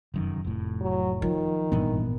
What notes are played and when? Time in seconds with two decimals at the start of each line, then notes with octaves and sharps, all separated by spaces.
0.14 F1 F#2 D#3
0.45 F1 A2
0.81 F#3
1.22 D#3 F3
1.72 G#1 G2 A#2 E3 B3